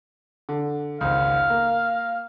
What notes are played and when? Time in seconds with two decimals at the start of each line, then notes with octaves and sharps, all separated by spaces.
0.49 D3
1.01 G#1 C#2 F5
1.50 A#3